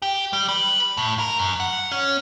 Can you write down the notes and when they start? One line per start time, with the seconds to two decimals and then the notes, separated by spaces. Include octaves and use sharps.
0.02 G4
0.33 G3
0.49 B4
0.97 A2
1.19 A#4
1.39 F#2
1.60 F#5
1.91 C#4